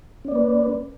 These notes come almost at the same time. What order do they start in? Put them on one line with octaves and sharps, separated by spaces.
C#4 D5 A#3 B4